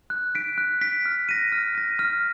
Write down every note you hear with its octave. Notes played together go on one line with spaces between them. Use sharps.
F#6
B6 D7
F#6
B6 D7
F6
A#6 D#7
F6
A#6 D#7
F6